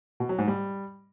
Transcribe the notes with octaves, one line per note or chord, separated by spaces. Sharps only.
B2
F#3
G#2
G3